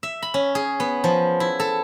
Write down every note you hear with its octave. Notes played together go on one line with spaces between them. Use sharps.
E5
B5
C#4
G#4
B3
F3
E4
A4